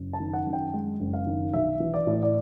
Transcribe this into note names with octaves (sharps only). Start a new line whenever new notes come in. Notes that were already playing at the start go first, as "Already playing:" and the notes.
Already playing: F#1
A5
D#3
F#5
F#2
G5
G#3
F#1
F5
D#3
B1 E5
E3
D5
A2
D5